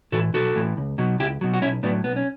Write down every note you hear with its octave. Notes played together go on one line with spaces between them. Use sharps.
A2 E3 F#4 A4
B1 F#4 A4
A2 E3
C#2
B2 F#3
C#2 E4 G4
B2 F#3
F#4
B1 C#4 E4
A2 F#3 B3 D4
B1 B3
C#4